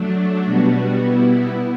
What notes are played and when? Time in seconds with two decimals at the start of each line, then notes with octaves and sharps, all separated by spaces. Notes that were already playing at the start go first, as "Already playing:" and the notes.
Already playing: F#3 A3 D4
0.46 B2 G3 B3 F#4
1.00 B2 G3 B3 E4